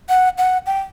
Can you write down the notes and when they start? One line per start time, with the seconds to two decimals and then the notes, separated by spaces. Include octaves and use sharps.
0.09 F#5
0.38 F#5
0.66 G5